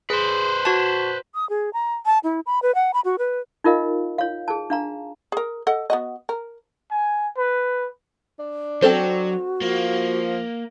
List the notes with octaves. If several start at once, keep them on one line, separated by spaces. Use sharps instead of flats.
G#4 B4 C5
F#4 A5
D#6
G#4
A#5
A5
E4
B5
B4
F#5
B5
F#4
B4
D#4 F4 A#4 D#5 F5
C#5 F5
G#4 A5
D4 F5 A#5
G#4 A#4
A4 D#5 F#5
B3 F#4 D#5
A#4
G#5
B4
D4
F#3 C4 F#4 A4 C5
F3 A#3